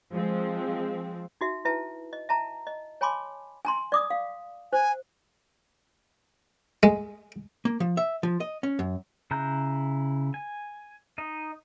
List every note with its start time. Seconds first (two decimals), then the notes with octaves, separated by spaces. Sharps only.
0.12 F3 G#3 C4
1.41 D#4 F#4 E5
1.65 E4 B4 E5 A5
2.13 D#5
2.29 E5 A5 A#5
2.67 D#5
3.01 C#5 G#5 A5 B5 C6 D6
3.65 G#5 A#5 C6
3.92 D5 D6 D#6
4.10 F5
4.73 C5 G#5
6.83 G#3
7.65 A#3
7.80 F3
7.97 E5
8.23 F3
8.40 D#5
8.63 C#4
8.79 F#2
9.31 C#3 E4 A#5 F#6 G6
10.34 G#5
11.18 D#4 D#5